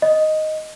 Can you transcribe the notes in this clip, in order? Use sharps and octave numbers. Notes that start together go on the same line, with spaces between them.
D#5